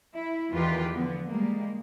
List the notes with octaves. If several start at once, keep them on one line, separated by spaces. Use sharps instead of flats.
E4
E2 D#3 E3 F4 G4 B4
D3 F3 B3
G3 G#3 A#3